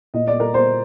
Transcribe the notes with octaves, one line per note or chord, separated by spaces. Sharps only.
A#2 D#5
D5
A#4
C5